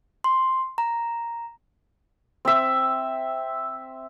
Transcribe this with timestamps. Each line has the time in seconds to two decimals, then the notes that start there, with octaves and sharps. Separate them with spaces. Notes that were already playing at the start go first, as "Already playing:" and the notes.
0.24 C6
0.78 A#5
2.45 C4 E5